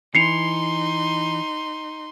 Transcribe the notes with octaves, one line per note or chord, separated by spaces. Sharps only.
E3 D#4 C6 C7 C#7 F7